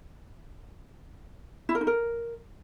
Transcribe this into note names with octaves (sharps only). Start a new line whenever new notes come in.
E4
A#4
D#4
A#4